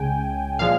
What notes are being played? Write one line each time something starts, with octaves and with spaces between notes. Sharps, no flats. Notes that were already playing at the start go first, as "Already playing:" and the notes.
Already playing: C#2 C#3 G#3 G5 G#5
A#2 F3 G#3 F5